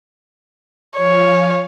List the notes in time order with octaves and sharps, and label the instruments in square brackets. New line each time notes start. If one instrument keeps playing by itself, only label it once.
[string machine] F3 F5 G#5 [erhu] C#5